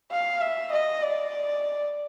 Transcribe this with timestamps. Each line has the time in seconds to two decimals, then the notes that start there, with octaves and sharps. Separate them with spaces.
0.11 F5
0.41 E5
0.72 D#5
1.03 D5